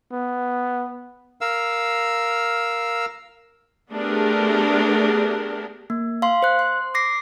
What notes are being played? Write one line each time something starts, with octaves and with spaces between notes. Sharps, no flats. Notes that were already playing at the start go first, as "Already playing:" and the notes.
B3
A#4 F5 E6
A3 B3 D4 G4 G#4 A#4
A#3
F5 C6
C5 F#6
C6
D6 A#6 C7